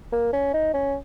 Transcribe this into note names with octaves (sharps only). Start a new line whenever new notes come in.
A#3
C#4
D#4
C#4